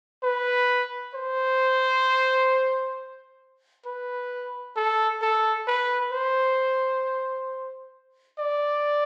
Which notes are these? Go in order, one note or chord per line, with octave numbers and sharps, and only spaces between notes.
B4
C5
B4
A4
A4
B4
C5
D5